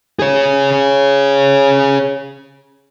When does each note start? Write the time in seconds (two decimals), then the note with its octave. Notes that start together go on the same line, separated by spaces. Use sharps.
0.19 G#4 C#5